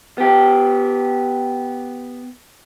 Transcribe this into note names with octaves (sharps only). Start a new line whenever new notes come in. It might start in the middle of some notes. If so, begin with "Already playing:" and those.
B3 G4